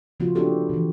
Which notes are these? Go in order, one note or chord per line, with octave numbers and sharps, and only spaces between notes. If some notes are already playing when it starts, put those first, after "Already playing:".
C#3 F3 A#3 C4 F4 F#4
B3 D4 E4 F#4 G4 A4
B2 E3